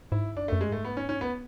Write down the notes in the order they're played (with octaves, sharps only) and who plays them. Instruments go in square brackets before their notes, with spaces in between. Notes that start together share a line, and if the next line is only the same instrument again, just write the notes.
[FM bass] G#2 [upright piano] E4
[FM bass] F#2 [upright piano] D4
[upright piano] A3
[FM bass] F#2
[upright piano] G#3
[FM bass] G#2 [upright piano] A3
[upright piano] B3
C#4
C#4
[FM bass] E2 [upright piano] B3